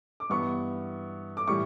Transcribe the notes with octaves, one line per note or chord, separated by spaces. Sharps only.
D6
G2 E3 B3 C#6
D6
A2 E3 G3 C#6